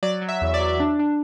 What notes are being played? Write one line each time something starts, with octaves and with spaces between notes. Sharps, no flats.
F#3 D5
F#3
E5
E2
D5
F#3
D4
D4